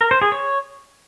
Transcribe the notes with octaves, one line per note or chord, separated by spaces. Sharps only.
A#4
C5
G#4
C#5